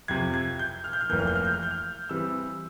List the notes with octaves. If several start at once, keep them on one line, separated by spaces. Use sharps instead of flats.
F2 C3 F3 G#6
G#6
G6
F6
G6
F6
F1 F2 E3 A#3 G6
F6
G6
F6
G6
F6
G6
F6
E3 G3 C4 E6